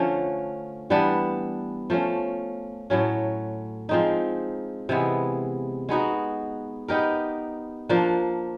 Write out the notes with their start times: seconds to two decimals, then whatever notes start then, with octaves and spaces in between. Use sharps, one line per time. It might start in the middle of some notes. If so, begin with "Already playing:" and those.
Already playing: D3 F3 A3 C#4
0.90 E3 G3 B3 D4
1.90 F3 A3 C#4
2.90 A2 F#3 A3 C#4
3.89 F3 G#3 C4 D#4
4.89 C3 E3 G#3 B3
5.89 G#3 B3 D#4 F#4
6.88 B3 D#4 G4 A#4
7.89 F3 A#3 D4